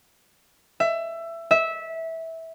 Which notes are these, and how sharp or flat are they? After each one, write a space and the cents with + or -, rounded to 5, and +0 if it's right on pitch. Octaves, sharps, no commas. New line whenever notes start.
E5 +20
E5 -15